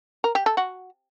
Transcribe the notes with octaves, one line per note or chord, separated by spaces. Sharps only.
A#4
G4
A4
F#4